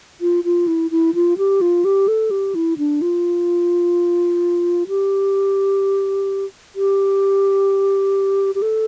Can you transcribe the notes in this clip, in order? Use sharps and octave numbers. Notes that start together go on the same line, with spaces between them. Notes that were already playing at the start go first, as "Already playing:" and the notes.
F4
F4
E4
E4
F4
G4
F4
G4
A4
G4
E4
D4
F4
G4
G4
G4
A4